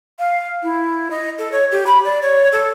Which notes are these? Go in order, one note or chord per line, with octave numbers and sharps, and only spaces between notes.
F5
E4
D#5
A4
C#5
G4
B5
D5
C#5
A4